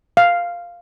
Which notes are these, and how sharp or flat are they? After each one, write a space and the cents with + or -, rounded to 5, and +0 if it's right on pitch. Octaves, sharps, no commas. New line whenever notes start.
F5 +0